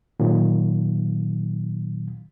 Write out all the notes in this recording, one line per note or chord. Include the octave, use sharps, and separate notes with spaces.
A#2 D#3 F#3